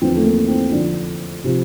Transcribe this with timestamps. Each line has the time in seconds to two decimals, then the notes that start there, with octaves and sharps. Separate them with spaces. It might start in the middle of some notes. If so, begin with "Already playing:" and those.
0.01 E2 D3 F3 C4
0.16 A3
0.25 A#3
0.48 C4
0.71 F2 D3 F3 D4
1.44 C3 F3